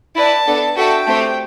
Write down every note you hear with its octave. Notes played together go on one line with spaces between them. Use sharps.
E4 B4 D5 A5
B3 D4 A4
F#4 A4 E5 G5 A5
A3 C4 G4 C5